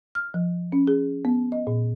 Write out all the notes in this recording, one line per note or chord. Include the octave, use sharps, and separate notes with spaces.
F6
F3
C#4
G#4
B3
D#5
A#2